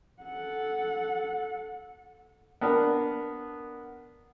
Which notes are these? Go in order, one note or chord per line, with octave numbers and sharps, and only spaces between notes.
A4 F#5
B3 D4 A#4